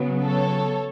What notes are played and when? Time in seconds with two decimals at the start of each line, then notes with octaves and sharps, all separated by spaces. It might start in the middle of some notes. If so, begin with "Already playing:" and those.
Already playing: C#3 F#3 B3
0.24 A4 C#5